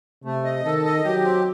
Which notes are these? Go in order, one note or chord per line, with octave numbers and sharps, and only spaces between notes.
C3 A3
D#5
D#3 A4
D#5
F#3 G4
C4